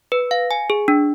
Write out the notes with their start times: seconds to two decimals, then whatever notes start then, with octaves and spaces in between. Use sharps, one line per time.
0.12 B4
0.31 F5
0.51 G#5
0.70 G#4
0.88 D4